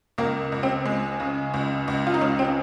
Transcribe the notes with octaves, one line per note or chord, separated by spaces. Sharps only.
C#2 A#3
C#2
C4
G#3
C#3
C#2
C#2
F4
D#4
G#3 C#4
C4